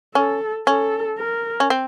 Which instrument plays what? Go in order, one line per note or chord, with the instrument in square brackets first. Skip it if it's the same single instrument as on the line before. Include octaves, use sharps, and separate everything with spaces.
[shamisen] C#4 [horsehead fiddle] A4
[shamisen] C#4 [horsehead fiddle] A4
[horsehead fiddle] A#4
[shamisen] C#4
C4